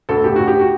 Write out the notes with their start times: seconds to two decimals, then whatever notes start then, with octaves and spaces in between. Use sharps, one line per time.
0.09 D2 A4
0.24 D2 G4
0.36 D2 F#4
0.48 G4
0.59 F#4